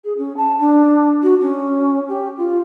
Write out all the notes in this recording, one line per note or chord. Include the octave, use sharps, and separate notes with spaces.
G#4
C#4
A5
D4
F#4
C#4
G4
F4